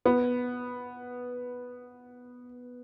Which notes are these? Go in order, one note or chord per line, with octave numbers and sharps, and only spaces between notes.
B3